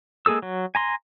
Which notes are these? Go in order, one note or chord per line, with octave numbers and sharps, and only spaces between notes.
G#3 A#3 G#4 A4 E6
F#3
G#5 A#5 C6